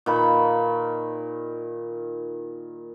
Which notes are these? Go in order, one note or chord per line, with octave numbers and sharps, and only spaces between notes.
A#2 D#3 B5